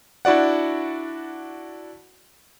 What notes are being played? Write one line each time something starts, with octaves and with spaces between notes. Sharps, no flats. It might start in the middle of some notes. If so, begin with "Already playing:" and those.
D4 E4 F#4 D5 F#5